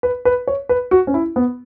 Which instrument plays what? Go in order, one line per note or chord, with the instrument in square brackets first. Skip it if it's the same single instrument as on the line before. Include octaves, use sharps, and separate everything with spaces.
[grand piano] B4
B4
C#5
B4
F#4
C#4
E4
B3